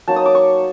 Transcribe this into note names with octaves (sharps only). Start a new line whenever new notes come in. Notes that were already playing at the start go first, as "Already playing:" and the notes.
F#3 A#3 D#4 A5
D#6
D6
C#6